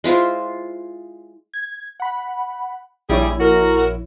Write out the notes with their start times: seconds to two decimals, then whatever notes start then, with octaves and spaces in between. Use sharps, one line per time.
0.04 G#3 E4 F4 C5
1.54 G#6
2.00 F#5 B5
3.09 A#1 G3 E4 G#4 C#5
3.40 F#4 A#4